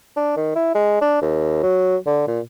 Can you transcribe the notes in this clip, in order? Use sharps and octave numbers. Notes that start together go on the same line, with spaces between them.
D4
D#3
E4
G#3
D4
D#2
F#3
D3
A#2